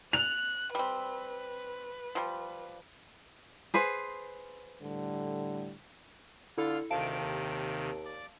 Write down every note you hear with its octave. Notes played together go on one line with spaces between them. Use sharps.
F#6 F7
G3 C4 B4
F3 G3
G#4 B4 C5
A2 D3 G3
D3 E4 F4 A4 F5
D2 C3 D#3 F5 A5 D7
D#2
D5